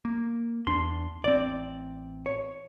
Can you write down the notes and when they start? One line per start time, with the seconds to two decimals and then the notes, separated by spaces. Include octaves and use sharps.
0.05 A#3
0.67 E2 D4 C6
1.24 A1 C4 D5
2.26 C#5